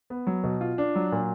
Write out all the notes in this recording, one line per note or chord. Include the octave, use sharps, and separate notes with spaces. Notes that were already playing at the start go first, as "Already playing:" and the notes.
B3
F#3
B2
F4
D4
F#3
A#2